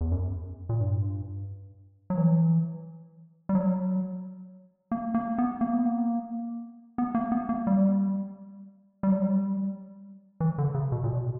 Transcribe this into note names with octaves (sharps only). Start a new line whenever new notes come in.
E2
F#2
A#2
G2
F#3
E3
G3
F#3
A#3
A#3
B3
A#3
B3
A#3
B3
A#3
B3
A#3
G3
G3
F#3
G3
E3
D3
C#3
B2
A#2
B2